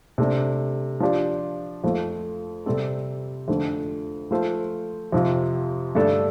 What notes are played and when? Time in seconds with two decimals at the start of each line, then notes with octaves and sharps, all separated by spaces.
0.18 C3 A3 D4
1.00 F3 D4 G4
1.84 F2 F3 A3
2.66 C3 G3 C4 A4
3.48 F2 D3 A3
4.31 F3 A3 F4 C5
5.12 F2 C3 F3
5.95 G2 D3 A3 D4 A4